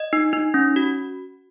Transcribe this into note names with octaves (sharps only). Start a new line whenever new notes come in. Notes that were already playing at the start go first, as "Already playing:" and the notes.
Already playing: D#5
D#4
D#4
C#4
F#4